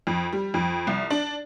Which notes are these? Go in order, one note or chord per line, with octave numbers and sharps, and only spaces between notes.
F2
G3
F2
C2
D4